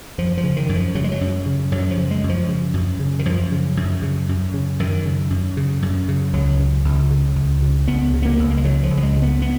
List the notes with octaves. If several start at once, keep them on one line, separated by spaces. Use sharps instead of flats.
F#2 F3
F3
C#3
D#3
F#2
F3
C#3 F#3
G#3
F#3
F#2
C#3
F#2 F#3
F3
C#3
G#3
F#2
F3
C#3
F#2
C#3
D#3
F#2 F3
C#3
F#2
C#3
F#2
C#3
F#2 D#3
C#3
F#2
C#3
F#2
C#3
C#2 F#3
C#3
C#2
C#3
C#2
C#3
C#2 B3
C#3
B3
A#3
C#2
A#3
G#3
C#3 F#3
F3
C#2
F#3
G#3
C#3
B3
B3